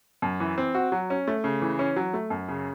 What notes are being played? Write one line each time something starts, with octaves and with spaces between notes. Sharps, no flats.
F#2
E3
C4
F#4
F#3
C#4
A3
C#3
E3
C#4
F#3
A3
F#2
C#3